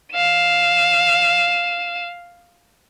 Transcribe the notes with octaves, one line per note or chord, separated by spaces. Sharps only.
F5 E7